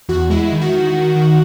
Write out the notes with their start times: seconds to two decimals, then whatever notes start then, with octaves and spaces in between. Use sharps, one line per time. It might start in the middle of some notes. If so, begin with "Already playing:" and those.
0.09 E2 F#4
0.30 G#3 E4
0.52 D#3
0.61 F#4
0.72 D#3
0.93 D#3
1.15 D#3